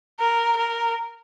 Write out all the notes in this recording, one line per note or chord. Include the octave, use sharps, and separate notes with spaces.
A#4
A#4